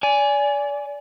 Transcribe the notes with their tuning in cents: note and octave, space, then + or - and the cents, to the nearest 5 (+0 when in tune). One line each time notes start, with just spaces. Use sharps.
D5 -30 G#5 +0